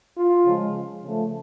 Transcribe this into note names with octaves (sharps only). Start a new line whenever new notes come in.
F4
C#3 F3 G#3
C#3 F3 A3